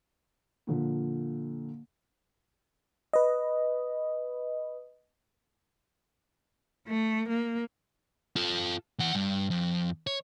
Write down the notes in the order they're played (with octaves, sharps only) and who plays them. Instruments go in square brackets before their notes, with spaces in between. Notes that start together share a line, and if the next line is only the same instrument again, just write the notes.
[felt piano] A#2 D3 F3
[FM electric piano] B4 D#5
[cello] A3
A#3
[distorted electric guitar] F4 A4
E3 F#5
G2
F2
C#5